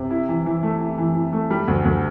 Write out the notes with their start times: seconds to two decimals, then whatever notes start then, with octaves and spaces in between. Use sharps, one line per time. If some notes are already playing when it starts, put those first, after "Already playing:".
Already playing: C3
0.10 E4
0.29 E3
0.46 E3
0.63 A3
0.81 E4
0.98 E3
1.15 E3
1.33 A3
1.50 G3
1.68 D2
1.85 D2